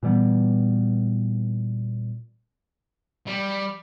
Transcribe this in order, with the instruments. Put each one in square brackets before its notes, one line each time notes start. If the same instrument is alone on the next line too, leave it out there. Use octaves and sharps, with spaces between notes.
[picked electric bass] A#2 E3 G3 B3
[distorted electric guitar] G3